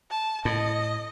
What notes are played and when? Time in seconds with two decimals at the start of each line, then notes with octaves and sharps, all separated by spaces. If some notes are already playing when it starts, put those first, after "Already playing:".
0.10 A5
0.45 A2 D#5